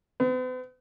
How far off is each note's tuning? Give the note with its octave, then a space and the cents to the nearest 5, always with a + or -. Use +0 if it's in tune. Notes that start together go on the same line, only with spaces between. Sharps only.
B3 +45